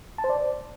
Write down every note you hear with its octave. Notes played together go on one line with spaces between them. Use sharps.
A5
C5
D5